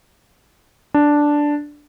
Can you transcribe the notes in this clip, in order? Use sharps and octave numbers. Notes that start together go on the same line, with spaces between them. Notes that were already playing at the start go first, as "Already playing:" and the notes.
D4